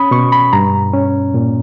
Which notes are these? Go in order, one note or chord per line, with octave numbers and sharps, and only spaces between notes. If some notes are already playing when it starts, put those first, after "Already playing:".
Already playing: C#4 B5 D#6
B2 C#6
B5
G2 A#5
C#4
A#2